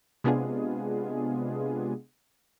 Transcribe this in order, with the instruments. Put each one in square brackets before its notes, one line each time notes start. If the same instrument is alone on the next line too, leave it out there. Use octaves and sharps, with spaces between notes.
[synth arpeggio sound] C3 G#3 B3 D4 F4 G#4